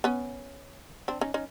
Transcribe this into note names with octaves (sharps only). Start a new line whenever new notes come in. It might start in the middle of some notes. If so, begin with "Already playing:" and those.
B3 C#4
C4 D4
C#4 D#4
C#4 D#4